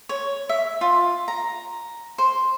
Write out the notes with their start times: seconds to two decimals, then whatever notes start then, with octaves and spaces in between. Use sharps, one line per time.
0.09 C#5
0.49 E5
0.81 F4
1.28 A#5
2.18 C5